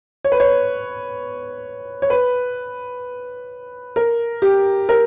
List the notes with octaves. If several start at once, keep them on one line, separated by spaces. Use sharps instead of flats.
C#5
B4
C#5
C#5
B4
A#4
G4
A#4